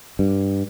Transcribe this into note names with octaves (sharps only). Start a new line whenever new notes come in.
G2